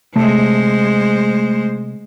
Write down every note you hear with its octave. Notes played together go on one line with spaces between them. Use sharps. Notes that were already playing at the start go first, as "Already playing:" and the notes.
C3 G#3 A3 C5